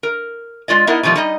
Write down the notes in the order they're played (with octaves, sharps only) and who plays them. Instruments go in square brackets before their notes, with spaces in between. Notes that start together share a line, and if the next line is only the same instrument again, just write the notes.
[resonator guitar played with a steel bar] A#4
G#3 F4 D5 D#5
B3 D#4 E4 A#4 D#5 F#5
B2 D#3 F3 G3 A3
G3 D#4 D#5